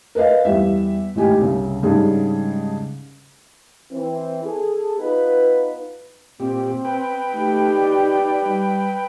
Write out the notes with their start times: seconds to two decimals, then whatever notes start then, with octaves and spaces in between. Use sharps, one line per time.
0.15 A#4 B4 D#5 F5
0.45 E2 G3 E5
1.15 A1 G#2 D#3 G4 G#5
1.41 C2 C#3
1.83 G#2 C#3 G3 G#3 D4 G#4
3.91 E3 C4
4.44 G#4 A4
4.98 B3 D#4 F4 B4
6.40 A#2 C4 G4
6.85 B4 G5
7.33 A3 D#4 G4
7.75 D5
8.44 G3